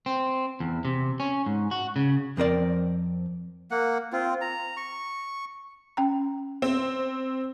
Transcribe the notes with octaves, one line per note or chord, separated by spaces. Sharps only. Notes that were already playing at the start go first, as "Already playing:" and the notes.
C4
E2
C3
C#4
G#2
F#4
C#3
F2 C4 A#4 D5
A#3 F#5
C4 F4
A#5
C#6
C#4 G5 A#5
C4